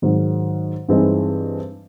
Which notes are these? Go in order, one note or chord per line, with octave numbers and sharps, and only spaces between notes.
G#2 D#3 F#3
G2 E3 G#3 C4 D#4